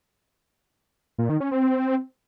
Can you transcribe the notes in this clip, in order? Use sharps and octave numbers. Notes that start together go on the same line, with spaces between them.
A#2
D#3
C#4
C4